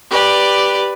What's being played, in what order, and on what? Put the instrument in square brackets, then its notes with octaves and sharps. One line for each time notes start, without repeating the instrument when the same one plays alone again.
[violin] G4 D5 [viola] B4